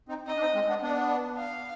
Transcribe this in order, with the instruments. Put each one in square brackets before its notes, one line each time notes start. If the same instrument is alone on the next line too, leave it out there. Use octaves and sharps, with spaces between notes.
[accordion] C4 D#4
[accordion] C4 D#4 [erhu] D#5
[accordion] D4
C4 D#4
G#3 C4
B3 D4
B3 D4
[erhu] F5